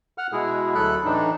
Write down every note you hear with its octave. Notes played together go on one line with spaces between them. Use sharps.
F#5 F6
B2 G#3 E4 G#4
D2 F#3 A3 A4 B5 F#6
A2 E3 D4 D#4